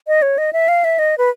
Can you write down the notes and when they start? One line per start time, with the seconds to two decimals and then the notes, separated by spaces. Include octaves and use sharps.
0.08 D#5
0.22 C#5
0.38 D#5
0.53 E5
0.68 F5
0.84 E5
0.99 D#5
1.18 B4